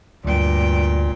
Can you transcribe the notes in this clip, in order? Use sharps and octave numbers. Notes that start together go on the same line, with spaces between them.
D2 G2 A#2 G5